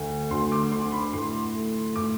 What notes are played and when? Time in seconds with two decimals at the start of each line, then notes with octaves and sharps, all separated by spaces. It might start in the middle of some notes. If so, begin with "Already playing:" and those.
Already playing: D2 A3
0.31 D2 C6
0.52 D6
0.72 D3 C6
0.92 B5
1.13 A2 C6
1.54 A3
1.96 A2 D6